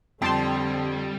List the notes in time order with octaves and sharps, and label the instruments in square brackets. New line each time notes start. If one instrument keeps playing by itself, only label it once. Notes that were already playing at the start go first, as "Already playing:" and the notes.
[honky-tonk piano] F2 [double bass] D3 C4 [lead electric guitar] G3 G4 [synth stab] G5 A5 C6